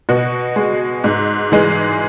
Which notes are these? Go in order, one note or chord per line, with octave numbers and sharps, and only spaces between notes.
B2 F#4
G#3
G#2
E3 G#3